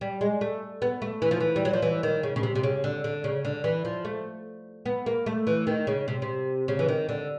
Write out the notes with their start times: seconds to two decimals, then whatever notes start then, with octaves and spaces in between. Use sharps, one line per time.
0.01 G3
0.21 G#3
0.41 A3
0.82 B3
1.02 A3
1.22 E3
1.31 F3
1.40 E3
1.56 G3
1.65 F#3
1.73 F3
1.82 E3
2.03 D#3
2.23 C#3
2.36 C#3
2.43 C3
2.55 C3
2.63 C#3
2.84 D3
3.04 D3
3.24 C#3
3.45 D3
3.64 E3
3.85 F3
4.05 A3
4.86 B3
5.06 A#3
5.26 A3
5.47 E3
5.67 D#3
5.87 C#3
6.08 C3
6.22 C3
6.68 C#3
6.79 E3
6.88 D#3
7.09 D3